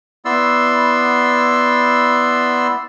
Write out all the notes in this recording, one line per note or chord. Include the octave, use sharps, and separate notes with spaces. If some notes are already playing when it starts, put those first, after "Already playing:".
B3 E4 D5 C6 E6